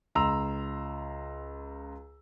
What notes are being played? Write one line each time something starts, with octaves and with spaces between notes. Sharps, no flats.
C#2 A#5 C6 E6 F7